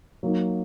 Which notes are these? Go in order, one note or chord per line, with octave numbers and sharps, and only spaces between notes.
F#3 A#3 D#4